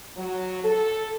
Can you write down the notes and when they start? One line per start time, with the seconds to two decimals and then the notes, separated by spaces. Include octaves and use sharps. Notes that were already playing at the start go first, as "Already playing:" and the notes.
0.17 F#3
0.64 A4